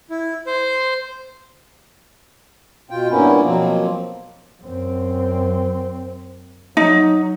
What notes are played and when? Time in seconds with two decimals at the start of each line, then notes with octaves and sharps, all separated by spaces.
0.10 E4
0.46 C5
2.90 B2 F4 G5
3.11 G2 A#2 A#3 B3 C#4 E4
3.43 B2 F3 F#3 A#3 C4
4.63 F#2 C4
6.77 F#3 D#4